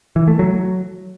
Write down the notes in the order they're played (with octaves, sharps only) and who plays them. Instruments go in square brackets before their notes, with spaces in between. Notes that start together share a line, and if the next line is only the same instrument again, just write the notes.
[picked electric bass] E3
A3
F#3